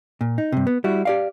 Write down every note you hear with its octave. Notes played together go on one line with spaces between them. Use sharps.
A#2
D#4
G2 C3
B3
G3 E4 F#4
G4 D5 F5